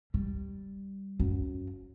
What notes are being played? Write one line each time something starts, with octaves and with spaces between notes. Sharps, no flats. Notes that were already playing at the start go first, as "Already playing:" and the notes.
G3
F#2